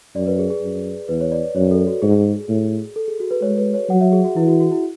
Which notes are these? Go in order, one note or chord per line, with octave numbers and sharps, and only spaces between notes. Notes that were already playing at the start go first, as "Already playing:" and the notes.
F#2 D5
B4
G#4
G#4
F#2
E2 B4
C#5
D5
F#2 C#5
A4
F#4
G#2 G#4
A2
A4
G#4
F#4
B4
G#3 C#5
B4
C#5
F#3 F#5
E5
G#4
F#4
E3 E4
F#4
F#4
E4